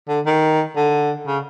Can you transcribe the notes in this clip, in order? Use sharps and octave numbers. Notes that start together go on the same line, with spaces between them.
D3
D#3
D3
C#3